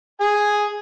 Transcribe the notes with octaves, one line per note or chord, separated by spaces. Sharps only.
G#4 G#5